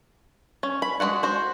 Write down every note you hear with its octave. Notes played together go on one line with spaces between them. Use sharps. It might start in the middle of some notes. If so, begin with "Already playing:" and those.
C#4
B5
G#3 A3 F#4 F#5
F#4 C5